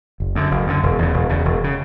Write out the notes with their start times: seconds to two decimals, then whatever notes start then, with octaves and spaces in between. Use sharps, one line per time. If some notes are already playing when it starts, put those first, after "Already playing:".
0.20 F#1
0.35 F#2 D3
0.51 F#1
0.67 F#2 D3
0.83 E1
0.99 E2 C#3
1.13 E1
1.29 E2 C#3
1.45 E1
1.64 C#3